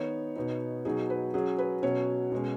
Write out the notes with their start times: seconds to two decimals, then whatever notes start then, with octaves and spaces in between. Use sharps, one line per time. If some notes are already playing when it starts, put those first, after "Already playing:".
Already playing: D#3 B3 D#4 C#5
0.36 B2 B3 D#4
0.85 B2 F#3 D#4 G#4
1.10 B4
1.34 F#3 C#4 G#4
1.58 B4
1.83 B2 F#3 C#4 C#5
2.32 B2 G#3 C#4